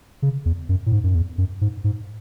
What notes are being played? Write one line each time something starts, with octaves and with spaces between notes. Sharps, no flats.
C#3
E2
F#2
A2
G#2
F#2
E2
F#2
G#2
G#2